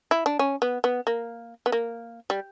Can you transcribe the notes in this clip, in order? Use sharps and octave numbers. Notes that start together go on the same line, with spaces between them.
E4
D4
C#4
B3
B3
A#3
B3
A#3
G3